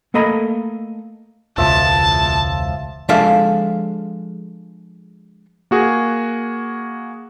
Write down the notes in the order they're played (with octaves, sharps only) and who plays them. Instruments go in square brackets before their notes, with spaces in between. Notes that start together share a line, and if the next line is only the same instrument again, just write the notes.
[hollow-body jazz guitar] A3 A#3 A4 D#5 A#5 B5
[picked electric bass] E1 C#2 [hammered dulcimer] F3 E5 [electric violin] A5
[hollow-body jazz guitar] F3 G#3 D4 A4 E5 F5
[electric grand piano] A#3 F#4 G#4